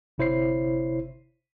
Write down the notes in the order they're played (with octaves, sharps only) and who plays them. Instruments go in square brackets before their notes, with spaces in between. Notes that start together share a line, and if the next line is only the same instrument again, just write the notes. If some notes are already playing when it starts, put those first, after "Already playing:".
[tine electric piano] G1 C3 E4 C5 C#5 C7